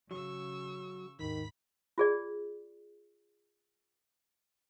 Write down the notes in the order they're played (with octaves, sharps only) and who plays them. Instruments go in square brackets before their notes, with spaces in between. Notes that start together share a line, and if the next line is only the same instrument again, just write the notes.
[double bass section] C#3 [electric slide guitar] F#3 [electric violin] C#6 E6
[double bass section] D#2 G#2 [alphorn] D#3 [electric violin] B5 B6
[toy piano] F4 G#4 D5